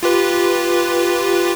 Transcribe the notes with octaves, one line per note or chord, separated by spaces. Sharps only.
F4 G4 B4